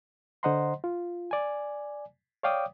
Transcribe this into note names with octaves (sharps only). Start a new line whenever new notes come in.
D3 C5 D#5 F#5 A#5 C6
F4
D5 G#5
C#5 D5 F5 G5 D6 D#6